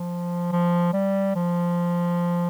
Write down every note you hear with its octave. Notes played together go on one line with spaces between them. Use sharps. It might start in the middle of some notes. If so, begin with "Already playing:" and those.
Already playing: F3
F3
G3
F3